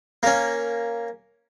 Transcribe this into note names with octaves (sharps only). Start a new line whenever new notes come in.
A#3 C#4